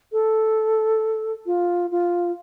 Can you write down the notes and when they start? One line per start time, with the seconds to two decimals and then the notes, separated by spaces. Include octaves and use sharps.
0.12 A4
1.46 F4
1.91 F4